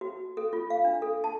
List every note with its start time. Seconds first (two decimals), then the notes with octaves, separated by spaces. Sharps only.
0.01 F#4
0.37 A4
0.53 F4
0.70 F5
0.85 D4
1.02 A4
1.24 A5